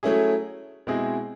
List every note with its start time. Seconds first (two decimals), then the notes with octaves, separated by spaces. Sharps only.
0.03 F#3 A3 C#4 E4 G#4
0.87 B2 G#3 C4 E4 G#4